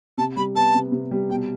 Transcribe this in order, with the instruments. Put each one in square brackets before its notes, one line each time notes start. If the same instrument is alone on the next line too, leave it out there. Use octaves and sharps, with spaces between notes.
[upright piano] C3 [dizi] A5
[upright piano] G3 [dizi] B5
[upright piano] B3 [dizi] A5
[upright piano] C3
C3
G3
[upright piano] B2 [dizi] G5